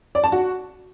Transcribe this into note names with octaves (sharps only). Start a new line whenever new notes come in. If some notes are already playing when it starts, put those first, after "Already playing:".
D5
A5
F#4